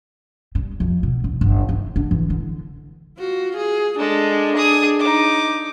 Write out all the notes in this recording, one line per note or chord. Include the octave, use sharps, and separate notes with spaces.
G3
F2
B2
D#1
G1
D#3
D4
E3
D3
F4 F#4
G#4
G#3 D4 A4
G#4 D#6
D#4 D6